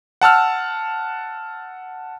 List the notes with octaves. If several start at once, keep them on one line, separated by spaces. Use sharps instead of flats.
F#5 A5 E6 F6